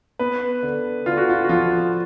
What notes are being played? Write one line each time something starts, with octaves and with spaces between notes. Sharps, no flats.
B3 B4
D3
D3 F4
F#4
F4
F#4
F3 F4